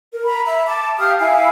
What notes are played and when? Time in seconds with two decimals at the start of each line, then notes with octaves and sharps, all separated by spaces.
0.12 A#4
0.25 A#5 B5
0.45 E5
0.66 A5 D6
0.98 G4 F5 D#6 F6
1.20 E4 F5 G#5